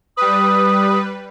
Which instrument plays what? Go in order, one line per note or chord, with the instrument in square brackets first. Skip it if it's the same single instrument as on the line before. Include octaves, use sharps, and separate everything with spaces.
[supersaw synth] G3 B4 [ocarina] D#6